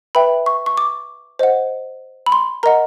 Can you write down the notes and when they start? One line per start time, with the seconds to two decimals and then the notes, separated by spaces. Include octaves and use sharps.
0.15 B4 E5 G5 B5
0.46 C#6
0.66 C#6
0.77 D6
1.39 C5 D#5 F#5
2.26 B5
2.32 C6
2.63 A#4 D#5 F#5 A#5